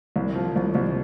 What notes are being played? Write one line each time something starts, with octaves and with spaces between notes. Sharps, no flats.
C2
F3
C2
C2